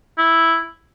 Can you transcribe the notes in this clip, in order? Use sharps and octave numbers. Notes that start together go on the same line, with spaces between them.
E4